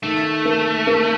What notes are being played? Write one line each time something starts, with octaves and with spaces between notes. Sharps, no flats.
D#3 A3
A#3
A#3